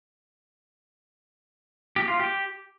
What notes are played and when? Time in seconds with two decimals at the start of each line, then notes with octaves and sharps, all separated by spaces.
1.96 G4
2.08 F4
2.19 G4